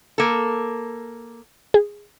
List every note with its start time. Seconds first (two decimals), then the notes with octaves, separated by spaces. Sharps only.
0.18 A#3 A4
1.74 G#4